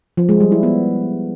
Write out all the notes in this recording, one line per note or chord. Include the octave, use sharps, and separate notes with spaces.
F3
G#3
G3
E4
B3